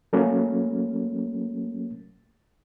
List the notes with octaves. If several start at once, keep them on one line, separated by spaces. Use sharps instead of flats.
F#3 A3 A#3 C#4